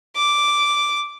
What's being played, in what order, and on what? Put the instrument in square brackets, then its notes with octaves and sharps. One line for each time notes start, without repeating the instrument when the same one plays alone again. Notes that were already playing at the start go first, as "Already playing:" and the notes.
[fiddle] D6